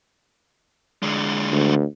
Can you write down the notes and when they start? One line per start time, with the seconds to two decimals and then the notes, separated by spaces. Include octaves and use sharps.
1.03 D3 G#3
1.52 D2